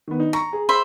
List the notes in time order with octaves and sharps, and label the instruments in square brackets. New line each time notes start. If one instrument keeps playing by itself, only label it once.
[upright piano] D#3 B3
D#4
[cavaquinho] A#5 [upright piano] C#6
[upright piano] G#4
[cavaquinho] C5 E5 B5